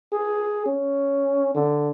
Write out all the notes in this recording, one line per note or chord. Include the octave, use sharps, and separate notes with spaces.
G#4
C#4
D3